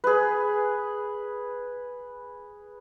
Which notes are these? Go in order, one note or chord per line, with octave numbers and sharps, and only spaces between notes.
G#4 B4